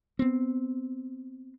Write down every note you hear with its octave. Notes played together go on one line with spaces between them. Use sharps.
B3 C4